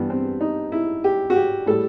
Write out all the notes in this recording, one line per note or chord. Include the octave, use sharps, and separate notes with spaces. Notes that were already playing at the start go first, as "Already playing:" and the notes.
Already playing: G2 E3 G3 B3
C4
D#4
E4
G4
F#4
G4
A2 G3 A4